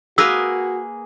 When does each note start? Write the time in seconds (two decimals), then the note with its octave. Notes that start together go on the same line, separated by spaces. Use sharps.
0.18 A#3 F#4 G#4 A#4 B4 E6